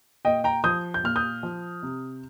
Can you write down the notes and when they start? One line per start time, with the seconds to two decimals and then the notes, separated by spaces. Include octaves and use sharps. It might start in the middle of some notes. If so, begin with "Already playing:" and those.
0.25 A#2 D#5 G5
0.44 G5 A#5
0.64 F3 D#6 G6
0.94 G6
1.03 A#2 F6
1.16 D#6 G6
1.43 F3
1.83 C3